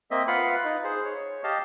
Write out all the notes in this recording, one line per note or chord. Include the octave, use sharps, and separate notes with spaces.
A#3 C4 D#5 E5
F4 B4 F5 F#5 B5
D#4
G#4 C5
C#5
G4 D#5 F5 A5